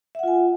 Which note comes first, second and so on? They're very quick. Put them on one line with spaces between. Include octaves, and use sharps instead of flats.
E5 F#5 F4 G#5